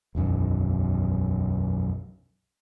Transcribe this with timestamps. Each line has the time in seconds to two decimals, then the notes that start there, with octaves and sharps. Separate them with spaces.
0.15 E1 B1 F#2 D#3